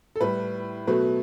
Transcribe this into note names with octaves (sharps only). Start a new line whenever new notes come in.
A4
A2 G3 B4
B2 F#3 A3 B4